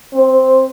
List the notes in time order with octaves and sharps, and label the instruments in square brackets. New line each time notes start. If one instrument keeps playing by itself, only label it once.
[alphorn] C4